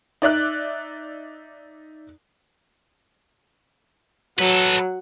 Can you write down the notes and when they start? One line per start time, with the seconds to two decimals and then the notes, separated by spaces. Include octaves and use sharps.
0.22 D#4 D5 E5 F#6
4.39 F#3 A4 B4